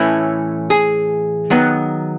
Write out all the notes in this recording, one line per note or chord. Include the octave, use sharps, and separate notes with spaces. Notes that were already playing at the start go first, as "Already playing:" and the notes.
Already playing: A2 E3 A3 C#4 E4
G#4
D#3 F#3 B3